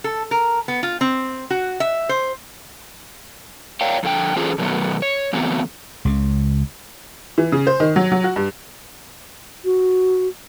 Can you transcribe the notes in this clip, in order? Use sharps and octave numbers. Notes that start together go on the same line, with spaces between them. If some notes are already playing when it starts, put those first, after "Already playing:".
A4
A#4
B3
F4
C4
F#4
E5
C5
C#5 D5 F5 G5
F2 D3 F4 G5
E3 C#4 F4 G#4 A4 C5
B2 D3 D#3 F#3 A3 B3
C#5
C#3 E3 F#3 A3 B3 C4
C#2 C#3
E3
C#3
C5
D#3
F#3
F#3
F#4
G2
F#4